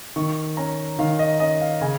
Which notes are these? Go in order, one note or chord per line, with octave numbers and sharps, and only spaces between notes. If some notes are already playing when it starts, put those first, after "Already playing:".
D#3 C#6
C#4 A#5
D#3 F5
D#5
C#4 D#5
F5
C#3 G#5